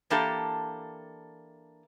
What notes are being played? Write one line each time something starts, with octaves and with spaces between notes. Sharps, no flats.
E3 A#3 D4 G4 A4